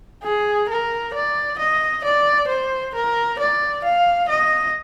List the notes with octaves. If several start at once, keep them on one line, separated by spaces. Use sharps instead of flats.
G#4
A#4
D5
D#5
D5
C5
A#4
D5
F5
D#5